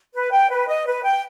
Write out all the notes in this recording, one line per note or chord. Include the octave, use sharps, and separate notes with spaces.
B4
G5
B4
D#5
B4
G5